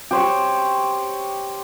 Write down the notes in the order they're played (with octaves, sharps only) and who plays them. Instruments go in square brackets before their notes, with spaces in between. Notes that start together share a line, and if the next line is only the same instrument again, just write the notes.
[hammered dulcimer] G4 C5 C#5